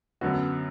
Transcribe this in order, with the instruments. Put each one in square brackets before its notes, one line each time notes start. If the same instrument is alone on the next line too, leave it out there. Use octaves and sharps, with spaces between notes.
[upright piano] F#2 D3 B3 F#4